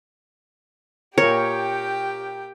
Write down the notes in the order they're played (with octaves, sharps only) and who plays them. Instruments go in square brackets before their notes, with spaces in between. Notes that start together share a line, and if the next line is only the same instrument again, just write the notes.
[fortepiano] A#2 A#4 [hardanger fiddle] G4 G5 [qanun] C#5